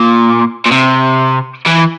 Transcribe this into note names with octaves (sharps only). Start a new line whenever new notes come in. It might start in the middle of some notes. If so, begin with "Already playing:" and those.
Already playing: A#2
A#2
C3
E3